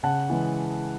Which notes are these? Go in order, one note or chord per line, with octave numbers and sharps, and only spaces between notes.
C#3 F#5 A5
E3 G#3